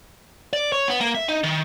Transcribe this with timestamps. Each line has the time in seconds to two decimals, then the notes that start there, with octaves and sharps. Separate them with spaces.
0.53 D5
0.72 C#5
0.88 B3
1.01 A#3
1.14 E5
1.28 D#4
1.43 D#3